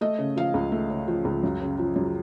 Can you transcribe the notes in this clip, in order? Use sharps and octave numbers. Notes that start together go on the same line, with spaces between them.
A3 D#5
C#3
F3 F5
C#2
A3
C#3
F3
C#2
F#2
C#3
F3
F#2